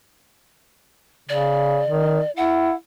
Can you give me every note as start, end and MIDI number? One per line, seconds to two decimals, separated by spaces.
1.29 1.82 49
1.29 2.31 74
1.87 2.19 51
2.37 2.72 64
2.37 2.75 78